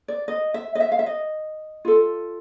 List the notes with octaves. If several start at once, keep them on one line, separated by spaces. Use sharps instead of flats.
D5
D#5
E5
D#5
E5
F5
E5
D#5
F4 A4